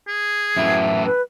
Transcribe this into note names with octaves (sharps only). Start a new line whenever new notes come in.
G#4
F#2 A2 E3 E5
B4